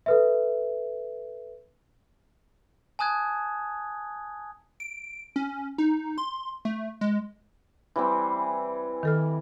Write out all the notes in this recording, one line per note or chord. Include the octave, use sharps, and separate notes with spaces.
A4 B4 E5
G#5 A5 D#6 F#6 G#6
D7
C#4
D#4
C6
A3
G#3
E3 G3 C4
D#3 A4 F6